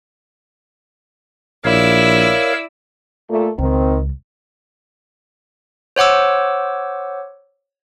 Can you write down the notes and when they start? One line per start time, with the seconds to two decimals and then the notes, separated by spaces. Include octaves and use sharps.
1.65 A#1 E4 A#4 C#5 D5 F5 E6
3.30 A#2 A3
3.59 C#2 D#3 C4
5.96 C5 C#5 F#5 D6 E6